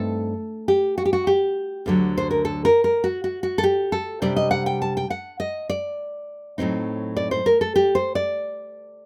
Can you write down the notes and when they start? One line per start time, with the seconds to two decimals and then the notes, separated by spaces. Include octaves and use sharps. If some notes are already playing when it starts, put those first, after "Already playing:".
Already playing: G2 A3 C4 D#4 A4
0.68 G4
0.98 F#4
1.05 G4
1.13 F#4
1.27 G4
1.86 D2 D3 F#3
2.18 C5
2.31 A#4
2.45 A4
2.65 A#4
2.84 A#4
3.04 F#4
3.24 F#4
3.43 F#4
3.58 A4
3.63 G4
3.92 A4
4.22 C3 G3 D4 D5
4.36 D#5
4.51 F#5
4.66 G5
4.82 A5
4.97 G5
5.10 F#5
5.40 D#5
5.70 D5
6.58 A2 F#3 C4 D#4
7.17 D5
7.31 C5
7.46 A#4
7.61 A4
7.76 G4
7.95 C5
8.15 D5